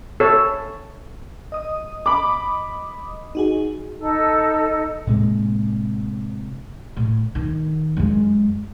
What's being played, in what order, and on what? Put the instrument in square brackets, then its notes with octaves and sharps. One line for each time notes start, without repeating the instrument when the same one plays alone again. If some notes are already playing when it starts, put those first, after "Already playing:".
[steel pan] A4 C#5
[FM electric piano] D#5 D#6
[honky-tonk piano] B5 D6
[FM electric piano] D#4 F#4 G#4
[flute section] D#4 A4
[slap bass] A2 C3 G#3 A#3
[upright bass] A2
D#3
F#2 G#3